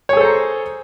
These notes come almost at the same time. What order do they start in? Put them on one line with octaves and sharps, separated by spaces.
C#5 G#4 A4 C5 A#5